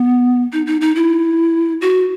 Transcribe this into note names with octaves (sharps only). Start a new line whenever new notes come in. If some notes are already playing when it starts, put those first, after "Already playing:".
Already playing: B3
D#4
D#4
D#4
E4
F#4